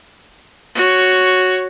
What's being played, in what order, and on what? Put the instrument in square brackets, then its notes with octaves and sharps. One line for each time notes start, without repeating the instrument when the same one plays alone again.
[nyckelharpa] F#4 C#5